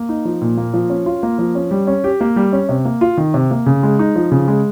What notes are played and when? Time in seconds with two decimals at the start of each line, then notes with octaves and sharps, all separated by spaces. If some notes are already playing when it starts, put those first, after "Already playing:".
Already playing: A#3
0.09 D#4
0.25 F3
0.42 A#2
0.57 A#3
0.74 F3
0.90 C#4
1.06 F4
1.23 A#3
1.39 F3
1.55 C#4
1.71 G3
1.87 C#4
2.04 G4
2.21 A#3
2.36 G3
2.53 C#4
2.69 C3
2.85 A#3
3.01 F4
3.18 D#3
3.34 C3
3.51 A#3
3.66 C#3
3.83 G#3
3.99 D#4
4.16 F3
4.31 C#3
4.48 G#3